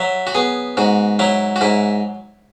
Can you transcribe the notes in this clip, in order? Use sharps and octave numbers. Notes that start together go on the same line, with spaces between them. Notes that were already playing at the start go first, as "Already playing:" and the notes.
Already playing: F#3 E5
F#4
B3 G#4
G#2 F#4
F#3 E4
F#4
G#2 E4